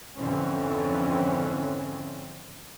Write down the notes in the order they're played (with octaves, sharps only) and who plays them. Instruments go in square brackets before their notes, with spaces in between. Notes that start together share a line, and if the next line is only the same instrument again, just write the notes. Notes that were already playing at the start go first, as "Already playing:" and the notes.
[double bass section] F2 G#2 D3 E3 C4 C#4